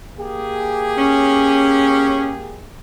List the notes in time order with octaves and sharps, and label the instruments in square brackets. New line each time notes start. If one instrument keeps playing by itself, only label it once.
[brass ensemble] A#3 G4 G#4
[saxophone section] C#4